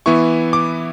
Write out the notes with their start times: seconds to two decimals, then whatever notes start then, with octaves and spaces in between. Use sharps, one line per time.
0.06 E3 B3 E4 C#6
0.53 D6